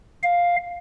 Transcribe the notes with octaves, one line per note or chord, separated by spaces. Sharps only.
F5